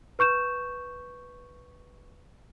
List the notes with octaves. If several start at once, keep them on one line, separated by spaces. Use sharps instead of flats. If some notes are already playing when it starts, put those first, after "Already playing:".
B4 C#6 G6 E7